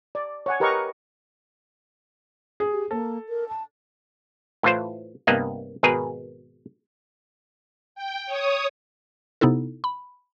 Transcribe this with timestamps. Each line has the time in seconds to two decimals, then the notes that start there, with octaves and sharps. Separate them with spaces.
0.15 D5
0.46 C#5 F#5 G#5
0.60 G4 A#4 B4 D#5 A#5 C#6
2.60 G#4
2.72 G4
2.91 A#3 A4
3.29 A#4
3.49 A5
4.63 A2 E3 F4 C5
5.27 C2 G2 A#3 B3 D#5 F#5
5.83 G#1 B2 G#4 A#4 B4
7.95 G5
8.26 C#5 D#6
9.41 C3 B3 D#4 E4 A4
9.84 B5